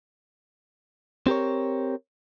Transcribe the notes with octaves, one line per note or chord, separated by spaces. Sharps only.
C4 G4 A#4 C#5